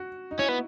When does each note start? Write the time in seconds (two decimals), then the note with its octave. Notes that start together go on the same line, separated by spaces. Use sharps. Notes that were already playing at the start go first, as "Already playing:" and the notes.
Already playing: F#4
0.31 D#4
0.39 C#4 E4
0.48 B3